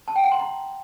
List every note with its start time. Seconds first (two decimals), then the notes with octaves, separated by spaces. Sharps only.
0.08 A5
0.16 G5
0.23 F#5
0.31 C6
0.39 A#5